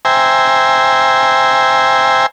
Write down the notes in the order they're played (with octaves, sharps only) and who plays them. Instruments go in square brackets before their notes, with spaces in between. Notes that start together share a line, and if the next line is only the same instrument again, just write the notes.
[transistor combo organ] C5 E5 G5 G#5 A#5